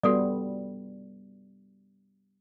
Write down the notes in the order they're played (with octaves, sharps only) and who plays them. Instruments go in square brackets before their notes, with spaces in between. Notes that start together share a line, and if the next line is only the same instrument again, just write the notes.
[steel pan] G3 B3 [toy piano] F#4 A4 D5